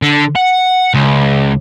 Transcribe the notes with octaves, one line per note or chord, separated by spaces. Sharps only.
D3
F#5
C#2